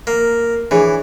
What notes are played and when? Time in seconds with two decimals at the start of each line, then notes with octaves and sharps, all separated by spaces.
0.07 A#3
0.71 E3 D4 G#4 C#5